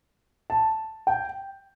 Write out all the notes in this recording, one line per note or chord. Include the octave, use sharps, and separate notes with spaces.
A5
G5